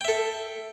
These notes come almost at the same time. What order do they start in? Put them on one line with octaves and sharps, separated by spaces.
G5 E5 A4